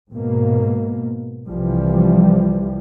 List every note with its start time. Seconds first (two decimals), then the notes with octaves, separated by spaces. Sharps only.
0.11 G#2 B2 A#3
1.48 C2 E3 F3 G3